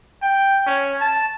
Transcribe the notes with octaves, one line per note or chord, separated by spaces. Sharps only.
G5
C#4
A5